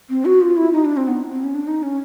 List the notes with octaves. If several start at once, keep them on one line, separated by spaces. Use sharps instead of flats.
C4
F#4
F4
E4
D#4
D4
C4
B3
C4
C#4
D4
D#4
C#4